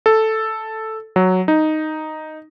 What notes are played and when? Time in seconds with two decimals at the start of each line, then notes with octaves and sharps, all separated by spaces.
0.06 A4
1.16 F#3
1.48 D#4